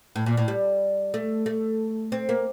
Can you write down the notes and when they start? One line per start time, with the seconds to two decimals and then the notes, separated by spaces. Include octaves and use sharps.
0.16 A2
0.26 A#2
0.37 A2
0.48 G3
1.14 A3
1.46 A3
2.12 C4
2.29 A#3